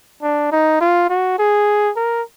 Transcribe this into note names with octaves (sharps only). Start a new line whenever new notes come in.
D4
D#4
F4
F#4
G#4
A#4